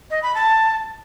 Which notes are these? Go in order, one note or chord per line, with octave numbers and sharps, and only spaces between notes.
D#5
B5
A5